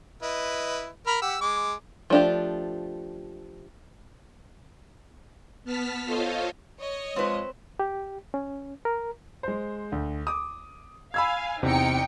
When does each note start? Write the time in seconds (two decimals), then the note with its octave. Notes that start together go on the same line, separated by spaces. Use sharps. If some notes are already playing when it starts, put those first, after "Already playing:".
0.23 E4 B4 D#5
1.07 A#4 B5 F6
1.22 G4 F#5 E6
1.41 G#3 D6
2.10 F3 A3 D4 F4 G4
5.64 B3 A5 F6 B6
6.05 F4 A4 C5 C#5 D#5 F5
6.80 C#5 D#5
7.16 F3 G#3 C4 B4
7.80 G4
8.34 C#4
8.85 A#4
9.43 G#3 C5
9.92 D2
10.27 D6 D#6
11.14 F5 G#5 B5 E6 G#6
11.63 E2 C3 C4 D#4 G5 C#7